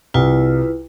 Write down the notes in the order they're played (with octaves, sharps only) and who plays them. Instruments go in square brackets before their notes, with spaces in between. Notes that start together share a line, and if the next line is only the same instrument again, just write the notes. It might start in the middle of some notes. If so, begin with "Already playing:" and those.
[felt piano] C2 [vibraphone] E4 F4 B4